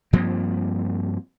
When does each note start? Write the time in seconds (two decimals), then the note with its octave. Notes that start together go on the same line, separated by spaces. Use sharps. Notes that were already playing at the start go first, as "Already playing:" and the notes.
0.13 G2 F3 A#3 C4